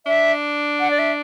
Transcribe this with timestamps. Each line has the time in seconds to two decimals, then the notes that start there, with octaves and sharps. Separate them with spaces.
0.06 D4 E5
0.80 F#5
0.91 D5
0.99 E5